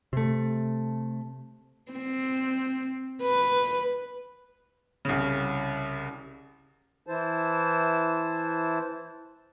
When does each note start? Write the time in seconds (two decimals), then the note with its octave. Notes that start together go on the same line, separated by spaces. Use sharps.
0.13 C3 A3
1.92 C4
3.22 B4
5.05 C2 C#3
7.06 E3 E4 C5 A5